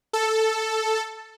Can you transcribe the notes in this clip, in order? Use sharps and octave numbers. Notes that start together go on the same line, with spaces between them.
A4